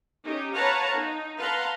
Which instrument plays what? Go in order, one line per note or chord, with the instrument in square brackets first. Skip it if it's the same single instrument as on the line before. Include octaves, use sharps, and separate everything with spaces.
[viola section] C#4 D#4 G4
B4 C#5 F5 F#5 A5 A#5
D#4
B4 F5 F#5 A5 A#5 C6